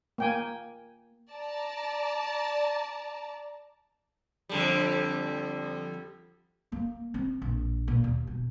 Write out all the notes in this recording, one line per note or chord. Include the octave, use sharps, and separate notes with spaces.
A#3 G5 G#5
D5 A5 A#5
F2 D3 G3
A#3
C4
A#1
A#2
D#2
B2